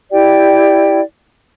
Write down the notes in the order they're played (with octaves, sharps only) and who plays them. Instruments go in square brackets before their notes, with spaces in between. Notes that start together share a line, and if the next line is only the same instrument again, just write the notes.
[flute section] E4 G4 D5 G5